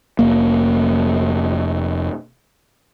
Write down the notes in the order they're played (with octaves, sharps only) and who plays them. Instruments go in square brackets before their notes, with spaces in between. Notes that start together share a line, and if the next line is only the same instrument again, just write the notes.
[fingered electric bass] F1 A#3